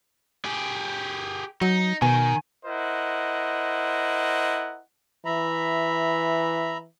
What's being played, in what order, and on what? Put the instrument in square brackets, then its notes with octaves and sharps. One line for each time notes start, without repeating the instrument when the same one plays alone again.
[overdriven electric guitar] G4 G#4
[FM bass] F#3 [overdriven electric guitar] D#4
[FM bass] B2 [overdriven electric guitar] D#3 [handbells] G#5
[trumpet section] E4 A#4 C5 D#5 F#5
[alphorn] E3 [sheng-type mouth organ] E5 A#5 B5